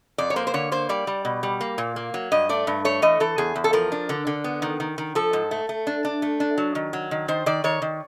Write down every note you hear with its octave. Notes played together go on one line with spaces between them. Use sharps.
F2 D5
C#5
A#3 C5
C5
D3 C#5
A#3 C5
G3 D5
G3
B2
G3
A#3
A#2
A#3
F#3
G2 D#5
A3 D5
G2
A3 C#5
E3 D#5
E3 A4
E2 G#4
E2
A4
F3 A#4
D4
D3
D3
B3
D#3
D#3
D#3
F3 A4
G#2
A3
A3
D4
D4
A3
D4
F#3
D#3
F#3
D#3
D#3 C5
D#3 D5
D#3 C#5
D#3